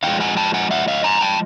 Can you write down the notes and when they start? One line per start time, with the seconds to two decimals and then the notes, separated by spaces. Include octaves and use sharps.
0.03 D3 F3 G#3 F5 G5
0.20 F#5 G#5
0.37 G5 A5
0.54 F#5 G#5
0.71 E5 F#5
0.88 D#5 F5
1.04 G#5 A#5
1.21 G5 A5